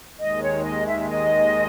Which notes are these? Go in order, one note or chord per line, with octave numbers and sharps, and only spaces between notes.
D#2 D#3 G#3 D#5
C#5
D#5
E5
D#5